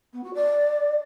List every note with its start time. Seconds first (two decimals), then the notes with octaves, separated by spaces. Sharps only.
0.13 B3
0.24 F#4
0.34 D5